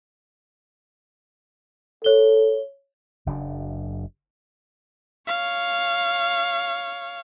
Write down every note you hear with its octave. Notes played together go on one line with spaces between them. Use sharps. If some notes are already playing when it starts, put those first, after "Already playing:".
A4 C#5 G7
F#1 F#2 C#3 D4
C#5 F5